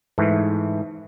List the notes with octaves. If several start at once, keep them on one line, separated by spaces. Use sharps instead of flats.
G#2 E3 A3